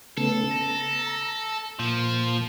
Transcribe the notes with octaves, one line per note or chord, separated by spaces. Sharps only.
C#3 A3 B3 A4
A#5
A#2 F3